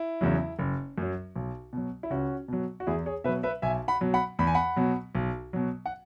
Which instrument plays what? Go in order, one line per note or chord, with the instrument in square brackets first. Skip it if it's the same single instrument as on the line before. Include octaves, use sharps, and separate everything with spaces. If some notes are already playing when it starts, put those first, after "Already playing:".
Already playing: [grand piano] E4
E2 C#3 F#3
F#1
F#2 F#3
B1
B2 F#3
E4
C#2 C#4 F#4
B2 F#3
F#4
E2 E4 G#4
G#4 C#5
B2 B4 E5
F#3
B4 E5
B1 E5 G#5
F#5 B5
B2 F#3
F#5 B5
E2 B5
G#5
F#5 B5
B2 F#3
B1
B2 F#3
F#5